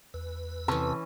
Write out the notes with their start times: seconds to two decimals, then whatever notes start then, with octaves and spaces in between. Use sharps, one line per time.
0.14 E2 B4
0.68 C3 E3 C#4 A4